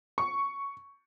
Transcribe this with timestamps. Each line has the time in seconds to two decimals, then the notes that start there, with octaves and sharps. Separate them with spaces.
0.18 C#6